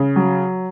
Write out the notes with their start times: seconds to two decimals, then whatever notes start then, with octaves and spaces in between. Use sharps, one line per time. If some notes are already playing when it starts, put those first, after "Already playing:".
Already playing: C#3
0.16 F#3